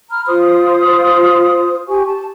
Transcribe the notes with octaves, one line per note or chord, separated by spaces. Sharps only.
A#5 B5 F6
F4 C5 C6 D#6
G4 G#5 C#6
A5